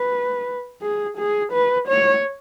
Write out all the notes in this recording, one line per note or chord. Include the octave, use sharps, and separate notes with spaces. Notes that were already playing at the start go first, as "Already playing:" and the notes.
Already playing: B4
G#4
G#4
B4
C#5